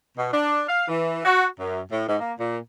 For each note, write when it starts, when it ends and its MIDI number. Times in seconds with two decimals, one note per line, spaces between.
0.17 0.30 47
0.32 0.63 62
0.68 0.86 77
0.88 1.21 52
1.25 1.46 66
1.59 1.80 42
1.91 2.04 45
2.07 2.15 44
2.20 2.32 58
2.39 2.58 46